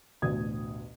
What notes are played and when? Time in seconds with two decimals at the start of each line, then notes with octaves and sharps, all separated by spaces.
0.22 A1 D2 B2 D#6 G#6